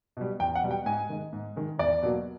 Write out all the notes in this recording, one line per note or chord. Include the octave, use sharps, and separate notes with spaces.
B2 G3
E2 G5
F#5
B2 G3
G5
G#2 G#5
D#3 G#3
G#2
D#3 G#3
E2 D5
B2 F#3 A#3